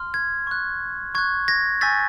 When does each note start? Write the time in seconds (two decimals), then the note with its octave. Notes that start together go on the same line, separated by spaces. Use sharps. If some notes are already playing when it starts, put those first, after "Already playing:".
Already playing: C6 F6
0.14 G#6
0.47 C#6 F#6
1.15 C#6 F#6 G#6
1.48 G#6 A#6
1.81 G#5 C#6 E6 G6 A6 B6